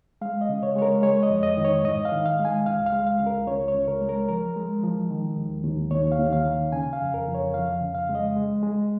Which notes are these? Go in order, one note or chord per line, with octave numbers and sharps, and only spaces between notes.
G#3 F5
D#5
C#3
C#5
G#3 C#5
A#4
G#3 C#5
D#5
F2
D#5
D#3
C#5
G#2 D#5
F5
D#3
F5
G#3
G#5
C#2 F5
F5
G#3
F5
C#2
A#4
C#2 C#5
C#5
C#2
A#4
G#3
A#4
F3 A#4
G#3
F3
D#3
D#2
D#2
D#2 C#5
F5
D#2
F5
D#3
C#3 G#5
F5
F2
A#4
F2
C#5
F3 F5
C#3
F5
G#3
D#5
G#3
G#3